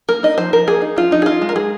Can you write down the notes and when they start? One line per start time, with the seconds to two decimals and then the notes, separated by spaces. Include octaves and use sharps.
0.09 A#3 A#4
0.23 D#4 D#5
0.38 F3 C5
0.53 F3 A#4
0.68 A#3 G#4
0.82 D#4
0.97 F3 F4
1.11 F3 D#4
1.22 G#4
1.26 D#4 F4
1.42 G#3
1.49 A#4
1.56 G#3 G#4